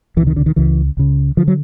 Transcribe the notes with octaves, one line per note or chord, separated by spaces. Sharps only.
C#2 C3 E3
D#3
D3
D#3
C#2 C#3 E3
C#2 C#3
D3 F3
F#3